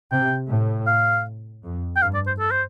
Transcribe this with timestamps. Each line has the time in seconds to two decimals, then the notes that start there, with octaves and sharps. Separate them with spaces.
0.11 C3 G5
0.49 A2
0.87 F5
1.64 F2
1.96 G5
2.01 G2 F5
2.14 D5
2.27 C5
2.40 A4
2.51 C5